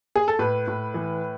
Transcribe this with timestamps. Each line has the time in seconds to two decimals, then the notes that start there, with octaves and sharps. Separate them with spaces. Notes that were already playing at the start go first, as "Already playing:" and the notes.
0.16 G#4
0.28 A4
0.39 A2 B4
0.68 A2
0.94 E3